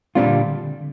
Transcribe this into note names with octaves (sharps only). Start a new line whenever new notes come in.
A#2 G3 G#3 C4 D4 F4
D3